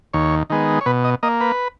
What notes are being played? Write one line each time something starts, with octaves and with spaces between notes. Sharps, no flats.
D#2 C#5
D#3 G#3 B3
C#5
B2 B4
D#5
A#3 D#5
B4